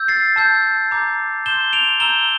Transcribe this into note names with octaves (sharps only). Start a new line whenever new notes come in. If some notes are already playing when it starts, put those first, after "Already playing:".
Already playing: E6 G6
A6 C7
A5 E6 G6
A#5 D6 G6
C6 G6 E7 G7
D7 F7
A#5 E6 G6 E7 G7